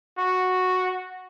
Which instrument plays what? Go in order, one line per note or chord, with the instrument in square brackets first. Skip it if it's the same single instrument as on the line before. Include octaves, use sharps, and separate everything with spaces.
[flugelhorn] F#4